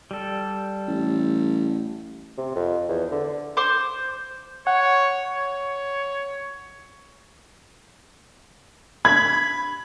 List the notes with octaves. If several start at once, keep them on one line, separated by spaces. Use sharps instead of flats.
G3 A4
A1
C3
F2
E2
D3
C5 D6
C#5 F#5
C#5
B5 G#6